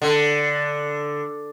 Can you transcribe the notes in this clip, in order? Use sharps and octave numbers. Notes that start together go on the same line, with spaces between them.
D3